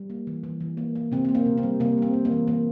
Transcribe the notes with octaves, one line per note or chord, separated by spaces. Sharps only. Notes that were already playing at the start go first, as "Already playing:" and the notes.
Already playing: G3
A#3
E3
E3
E3
A#3
A#3
C3 C4
A#3 C4
A#3
C3
C4
G3
C3 A#3
G3 C4
A#3
A#3
E3
E3 A#3